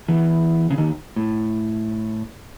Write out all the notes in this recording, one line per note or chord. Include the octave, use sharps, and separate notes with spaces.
E2 E3
C#3
D#2 D#3
A2